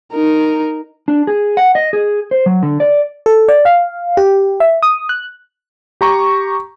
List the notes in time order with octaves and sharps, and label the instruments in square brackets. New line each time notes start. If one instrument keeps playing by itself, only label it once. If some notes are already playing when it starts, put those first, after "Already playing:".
[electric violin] D#4 A#4
[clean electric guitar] D4
G#4
F#5
D#5
G#4
C5
F#3
D3
D5
[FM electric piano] A4
D5
F5
G4
E5
D#6
F#6
[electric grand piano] G4 A#5 C#6